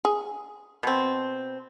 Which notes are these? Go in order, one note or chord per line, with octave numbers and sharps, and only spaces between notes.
G#4
B2 C4